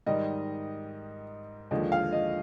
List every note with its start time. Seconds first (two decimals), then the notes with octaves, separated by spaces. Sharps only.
0.06 G#2 D#3 G3 D#5
1.71 D#2 D3 F3 G#3 D#5
1.92 F5
2.12 D#5